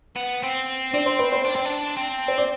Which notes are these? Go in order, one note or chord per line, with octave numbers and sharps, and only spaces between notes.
B3
C4
C4 D4 D5
C5 C6
B4 B5
C5 C6
D4
C4
D4
C4
C5
D5